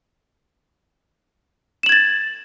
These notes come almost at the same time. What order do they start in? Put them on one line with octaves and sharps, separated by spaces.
E7 F#7 G#6 A6